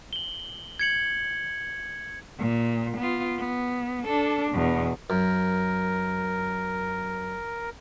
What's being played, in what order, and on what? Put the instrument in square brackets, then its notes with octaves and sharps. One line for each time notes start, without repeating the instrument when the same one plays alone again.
[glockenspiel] F#7 G7
G#6 C#7 F#7
[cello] A#2
B3 F4
B3
D4 A4
E2 B2
[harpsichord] F#2 [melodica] A#4